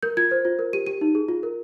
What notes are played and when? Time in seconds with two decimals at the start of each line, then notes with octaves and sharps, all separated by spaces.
0.03 A#4 G6
0.17 F4 G#6
0.31 C5
0.45 F4
0.59 A#4
0.73 G4 D#7
0.87 G4 D#7
1.01 D#4
1.15 G#4
1.28 F4
1.43 A#4